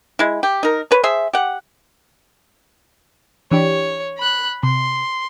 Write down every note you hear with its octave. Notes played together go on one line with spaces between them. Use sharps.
G#3 E4
G4
D#4 A#4
B4 C#5
G#4 C5 E5
G4 F#5
E3 D4 G4 C#5
B5 F#6
C3 C6